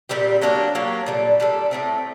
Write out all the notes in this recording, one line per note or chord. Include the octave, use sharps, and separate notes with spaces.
A#2 G3 C4 G4
F#3 A#3 D4 G4
F#3 A#3 D4 G4
A#2 G3 D4 A4
A#2 G3 D4 A4
A2 A3 C4